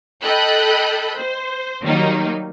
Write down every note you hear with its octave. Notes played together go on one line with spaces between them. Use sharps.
A4 D#5 G5 B5 F#6 G6
C5
D#3 F#3 G3 A#3 D#4